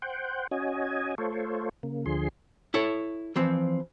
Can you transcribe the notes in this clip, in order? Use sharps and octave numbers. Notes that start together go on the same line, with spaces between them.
C5 F#5 G5
C#4 F#4 D#5 G#5
A3 F4 A4 C5 C#5
C#3 A#3
D2 D3 F3 G#4 C6
E4 A4 C#5
E3 F3 C4